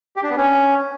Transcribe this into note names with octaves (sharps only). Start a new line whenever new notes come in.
G4
D4
B3
C#4